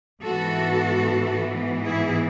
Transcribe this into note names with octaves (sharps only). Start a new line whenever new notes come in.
G#2 E3 B3 F#4 A4
E4 G#4